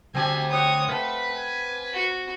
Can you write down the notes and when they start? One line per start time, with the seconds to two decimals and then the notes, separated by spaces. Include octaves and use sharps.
0.15 D2 C4 G4 G#5 A5
0.50 C#5 F#5 G5 C6 D#6
0.88 A3 B4 F5
1.36 G#5
1.93 F#4